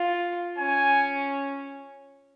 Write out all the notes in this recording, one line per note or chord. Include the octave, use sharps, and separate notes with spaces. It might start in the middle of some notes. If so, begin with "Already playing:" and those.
Already playing: F4
C#4 G#5